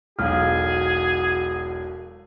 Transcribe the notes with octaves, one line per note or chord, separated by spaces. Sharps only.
E1 B1 F#4 G#4 F5 F6